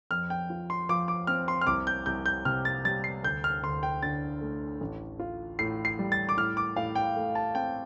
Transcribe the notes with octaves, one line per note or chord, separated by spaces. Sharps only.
F2 F6
G5
F4
C6
F3 D6
D6
C4 F6
C6
F6
C2 D6
G6
C2 G6
G6
C3 F6
A6
G3 A6
C7
D2 G6
F6
D2 C6
G5
D3 A6
A3
A1
F4
A2 C7
C7
G3
A6
D6
A2 F6
D6
A2 F5
G5
A3
A5
C4 G5